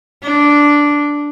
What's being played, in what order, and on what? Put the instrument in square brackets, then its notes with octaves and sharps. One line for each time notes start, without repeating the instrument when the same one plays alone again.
[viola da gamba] D4